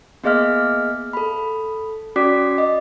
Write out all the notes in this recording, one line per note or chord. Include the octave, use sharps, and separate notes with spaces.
A#3 B3 G#4 D#5 F5 F6
A4 B5
C#4 F#4 D5 D6 B6
D#5